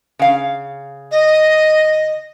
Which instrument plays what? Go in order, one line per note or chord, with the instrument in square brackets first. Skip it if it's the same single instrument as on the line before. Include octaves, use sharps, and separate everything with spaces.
[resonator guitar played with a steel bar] C#3 F5
[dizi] D#5